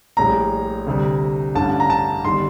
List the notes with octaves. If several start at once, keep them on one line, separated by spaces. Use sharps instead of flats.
A#1 A2 G3 A#5
D2 C3 G3
A1 G2 D3 G3 A5
A#5
A5
G1 D#3 G3 C6